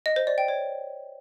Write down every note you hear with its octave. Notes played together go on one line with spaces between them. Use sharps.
D#5
C5
D5
G5
C#5